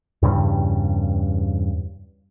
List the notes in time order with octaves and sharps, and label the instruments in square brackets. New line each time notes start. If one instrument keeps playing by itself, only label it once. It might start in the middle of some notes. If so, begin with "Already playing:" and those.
[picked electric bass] E2 G2 C#3 G3